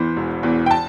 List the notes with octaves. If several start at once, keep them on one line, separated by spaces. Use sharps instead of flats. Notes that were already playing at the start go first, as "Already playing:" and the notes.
Already playing: E2 E3 C5
E1
E2 E3
G5
A5